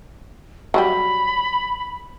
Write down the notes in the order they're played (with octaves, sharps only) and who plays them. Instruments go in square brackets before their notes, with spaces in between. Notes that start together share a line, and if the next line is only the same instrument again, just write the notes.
[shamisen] F#3 G3 G4 [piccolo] B5